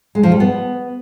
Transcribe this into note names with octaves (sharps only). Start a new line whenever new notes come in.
G#3
F3
G3
B3